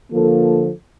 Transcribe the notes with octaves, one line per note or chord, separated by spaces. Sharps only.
D3 F3 A#3 F4 A4